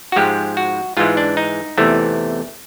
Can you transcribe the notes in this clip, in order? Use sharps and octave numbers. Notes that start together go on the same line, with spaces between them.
F#4
G#2 F3 G#3 G4
F#4
G#2 E3 G#3 F4
D4
D#4
E2 C3 E3 A3